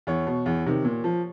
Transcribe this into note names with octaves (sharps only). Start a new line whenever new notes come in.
E2 C#5
B2
E2
C3 D#3
A#2
F3